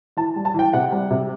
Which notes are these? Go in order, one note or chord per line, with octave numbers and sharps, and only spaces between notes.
E3 A5
G3
A5
E3 G5
C3 F#5
G3
C3